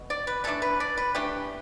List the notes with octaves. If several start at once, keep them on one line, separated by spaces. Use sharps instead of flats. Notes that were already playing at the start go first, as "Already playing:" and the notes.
Already playing: B2
D5
B4
E3 A3 D4 A4
B4
D5
B4
E3 A3 D4 G4